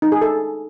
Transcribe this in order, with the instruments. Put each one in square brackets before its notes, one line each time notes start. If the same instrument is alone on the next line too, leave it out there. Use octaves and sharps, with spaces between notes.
[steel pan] D#4
G#4
A4